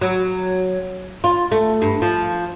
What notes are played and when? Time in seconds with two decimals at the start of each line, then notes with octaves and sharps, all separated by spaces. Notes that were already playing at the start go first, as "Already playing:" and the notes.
0.01 F#3
1.24 F4
1.51 A3
1.82 G2
2.02 F3